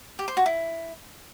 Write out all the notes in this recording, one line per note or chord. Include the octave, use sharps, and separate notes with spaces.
G4
C5
F#4
E4